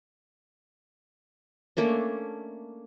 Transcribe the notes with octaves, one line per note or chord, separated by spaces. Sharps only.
A3 A#3 C#4 D4